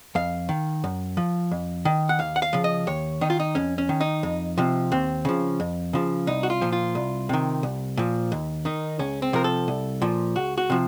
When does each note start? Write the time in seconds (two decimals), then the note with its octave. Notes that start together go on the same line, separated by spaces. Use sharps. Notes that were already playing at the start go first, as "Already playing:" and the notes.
0.15 F2 F5
0.49 D#3
0.84 F#2
1.17 F3
1.51 F2
1.85 D#3
2.09 F#5
2.19 D#2 F5
2.36 F#5
2.42 F5
2.53 C#3 F3
2.64 D#5
2.87 D#2 C#5
3.21 D#3 D#4
3.30 F4
3.40 D#4
3.55 F2 C#4
3.78 C#4
3.89 D#3
4.01 D#4
4.23 F2
4.58 C3 F3
4.92 D#2 C4
5.25 C#3 F3
5.60 F2
5.93 C#3 F3
6.27 C2 D#4
6.43 F#4
6.50 F4
6.61 A#2 F3
6.73 F4
6.95 C2
7.29 C3 D#3
7.63 C2
7.97 A#2 F3
8.32 D#2
8.65 D#3 D#4
8.99 C#2 C#4
9.22 C4
9.33 C3 F3 A#4
9.44 A4
9.68 C2
10.02 A#2 F3
10.36 C#2 F#4
10.58 F#4
10.70 C3 F3